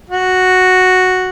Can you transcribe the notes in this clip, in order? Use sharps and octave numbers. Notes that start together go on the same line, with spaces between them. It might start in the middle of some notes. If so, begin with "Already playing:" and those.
F#4